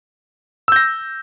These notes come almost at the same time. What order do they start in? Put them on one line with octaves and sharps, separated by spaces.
E6 G6 A#6